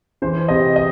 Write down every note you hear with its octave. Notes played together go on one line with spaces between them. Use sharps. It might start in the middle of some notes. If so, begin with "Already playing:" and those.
E3 C5
C3 D#5
D#5